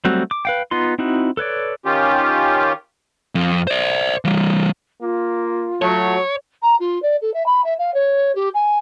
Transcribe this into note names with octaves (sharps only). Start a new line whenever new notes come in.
F#3 G3 A3 C4 F#4
D6
B4 F5 G5
B3 D#4 F4 C6
C4 D#4 E4 F#4
A4 B4 C#5 D5
D#3 C#4 F4 G4
F2
C5 D5
E3 G3
A#3 F4
F#3 A3 C#5
A#5
F4
D5
A4
E5
B5
E5
F5
C#5
G4
G#5